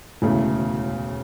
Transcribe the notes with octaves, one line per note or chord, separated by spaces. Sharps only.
E1 D2 C#3 E3 A3